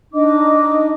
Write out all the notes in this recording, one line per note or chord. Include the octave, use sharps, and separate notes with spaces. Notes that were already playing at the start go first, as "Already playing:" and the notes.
D4 D#4 D#5 D6